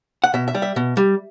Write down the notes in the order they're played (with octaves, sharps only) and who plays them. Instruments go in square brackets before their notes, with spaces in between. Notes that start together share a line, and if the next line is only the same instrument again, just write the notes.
[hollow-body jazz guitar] F#5
B2 E5
E5
G3
E5
B2
G3